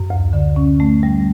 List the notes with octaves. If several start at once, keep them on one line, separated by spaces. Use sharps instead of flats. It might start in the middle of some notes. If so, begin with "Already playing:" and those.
Already playing: F#2
D2
D3
C#4
A3
G3